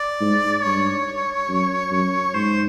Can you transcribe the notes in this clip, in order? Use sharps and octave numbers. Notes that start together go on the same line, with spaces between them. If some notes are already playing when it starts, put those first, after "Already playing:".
Already playing: D5
G#2
G2 C#5
F#2
F#2
G#2 C5